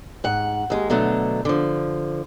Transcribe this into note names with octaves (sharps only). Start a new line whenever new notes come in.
G#2 F#5
D#2 G#3
B2 D3 F#3 A3
D3 F3